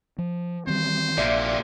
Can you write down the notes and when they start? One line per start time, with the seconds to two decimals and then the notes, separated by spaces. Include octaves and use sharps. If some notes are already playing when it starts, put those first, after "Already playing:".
0.18 F3
0.67 D#3 E3 G3 C4 C5
1.18 A#1 C3 A#3 D5 E5